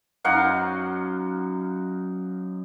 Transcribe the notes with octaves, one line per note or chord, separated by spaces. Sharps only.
F#2 D#4 F5 F#5